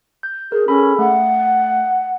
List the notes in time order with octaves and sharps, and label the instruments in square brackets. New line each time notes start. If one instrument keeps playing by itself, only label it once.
[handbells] G6
[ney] G#4 [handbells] A#4
[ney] C#4 [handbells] G#4 A4 B5
[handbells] A3 [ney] F#5